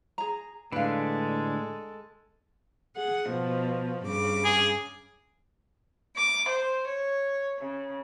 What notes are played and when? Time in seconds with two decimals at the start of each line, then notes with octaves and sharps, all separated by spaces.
0.18 G#4 A#5
0.72 A2 D3 G#3 D4 A4 B4 F5
2.95 G#4 F#5
3.27 B2 F3
4.04 G2 C#3 D6
4.45 G#4
6.15 D6
6.47 C5
6.86 C#5
7.60 C#3